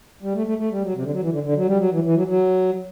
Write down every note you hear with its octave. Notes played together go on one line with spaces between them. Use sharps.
G3
A3
A3
A3
G3
F#3
C3
D3
F#3
E3
D3
D3
F#3
G3
F#3
E3
E3
F#3
F#3